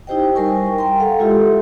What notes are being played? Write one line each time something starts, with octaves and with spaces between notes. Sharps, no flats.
D#4 E4 G4 C5 D#5 G5
G3 A#4 G#5 C#6
G5
G5 A#5 C6
A4 F5 F#5 A#5 C6
G#3 E4 F4 G4 A4 E5